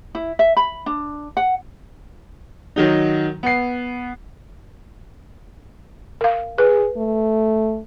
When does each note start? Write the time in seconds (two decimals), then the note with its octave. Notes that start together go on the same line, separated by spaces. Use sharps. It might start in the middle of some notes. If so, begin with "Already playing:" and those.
0.15 E4
0.39 E5
0.57 B5
0.86 D4
1.37 F#5
2.76 D#3 F#3 D#4
3.43 B3 C7
6.21 A#4 F5
6.58 G#4 B4
6.97 A3